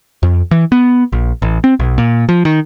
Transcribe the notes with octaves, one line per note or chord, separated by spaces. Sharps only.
F2
E3
B3
A#1
A1
C4
B1
A#2
F3
D#3